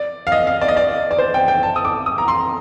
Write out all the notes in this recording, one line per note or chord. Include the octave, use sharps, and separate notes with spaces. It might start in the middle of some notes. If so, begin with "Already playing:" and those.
Already playing: D5
F5
D#5
F5
D5
D#5
D5
D5
C5
G5
G5
A5
D#6
D6
D#6
A#5
C6